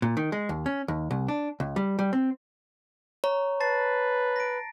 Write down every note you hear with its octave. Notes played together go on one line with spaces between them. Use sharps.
A#2
D#3
G#3
D#2
C#4
D#2
C2
D4
C#2
G3
G3
C4
C#5 A#5
B4 A5 A6 C7
A#6 D7